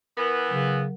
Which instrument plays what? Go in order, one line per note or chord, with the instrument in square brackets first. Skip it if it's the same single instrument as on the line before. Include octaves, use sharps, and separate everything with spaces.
[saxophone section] E3 B3 [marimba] A#4
[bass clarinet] C#3 [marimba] F#3